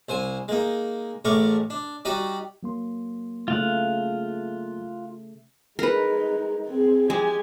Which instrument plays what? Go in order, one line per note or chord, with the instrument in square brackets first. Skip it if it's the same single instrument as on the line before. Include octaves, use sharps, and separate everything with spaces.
[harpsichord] C2 C5 G#5
G#3 A#3 D#4
A1 G#3 A3 A#4 C#6 D6
D4
G3 D#4 F#4 D5 D#5 G5
[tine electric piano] F#3 A#3 C6
[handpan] C#3 A3 [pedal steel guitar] F4 F5 F#5
[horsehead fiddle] G#3 D#4 [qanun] A#4 B4
[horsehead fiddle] C4 G#4
[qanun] G#3 [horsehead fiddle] G4 G#5